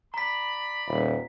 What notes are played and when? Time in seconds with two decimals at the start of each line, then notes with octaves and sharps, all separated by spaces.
0.14 D5 A#5 B5 B6
0.87 D#1